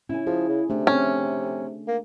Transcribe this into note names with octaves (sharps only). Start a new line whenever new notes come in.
C#4 E4 G#5
F3 G#4
C#3
C3 A3 D4
F3 C4 C#4 A4
A#3